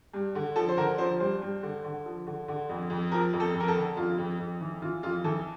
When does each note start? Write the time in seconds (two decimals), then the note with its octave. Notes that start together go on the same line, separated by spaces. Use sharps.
0.14 G2
0.35 D3
0.56 F3 A4
0.69 C5
0.77 D3 A#4
0.98 F3 C5
1.20 G2 C5
1.41 G2
1.63 D3
1.84 D3
2.06 F3
2.27 D3
2.48 D3
2.69 F2
2.90 F2
3.11 F3 A#4
3.33 F2
3.40 A4
3.54 F2
3.60 A#4
3.68 A4
3.76 D3
3.96 F2 F4
4.18 F2
4.39 F2
4.61 E3
4.82 E3 F4
5.03 F2 F4
5.24 E3 A4